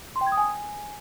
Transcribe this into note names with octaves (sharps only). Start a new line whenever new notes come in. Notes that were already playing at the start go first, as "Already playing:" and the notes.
C6
G5
G#6
D#6
G#5